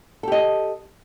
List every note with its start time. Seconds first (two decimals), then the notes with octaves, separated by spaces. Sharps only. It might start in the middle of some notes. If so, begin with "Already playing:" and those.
0.23 A4
0.28 G4
0.32 D#5